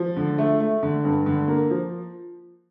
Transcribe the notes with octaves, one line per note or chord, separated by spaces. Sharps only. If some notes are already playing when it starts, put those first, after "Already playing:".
Already playing: F3
D3
A3
A3
D3
G2
D3
A#3
F3